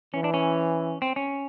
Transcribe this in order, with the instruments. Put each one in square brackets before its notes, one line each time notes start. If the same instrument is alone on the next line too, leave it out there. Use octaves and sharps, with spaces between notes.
[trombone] E3 [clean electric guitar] C#4
[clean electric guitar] D4
C#4
C4
C#4